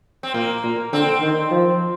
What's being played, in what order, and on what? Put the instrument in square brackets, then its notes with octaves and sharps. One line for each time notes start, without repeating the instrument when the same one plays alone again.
[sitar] C4
[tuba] A#2 [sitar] A#3
[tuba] A#2
[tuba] D3 [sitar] C4
[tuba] D#3
F3